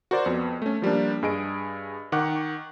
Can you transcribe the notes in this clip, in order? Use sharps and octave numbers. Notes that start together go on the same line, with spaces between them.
F#4 A#4 C5 D5
F2 B3
A3 C#4
F3 G3 A#3 D4
G2 G#4 D#5 D7
D#3 F#5 C#6 D6 F#6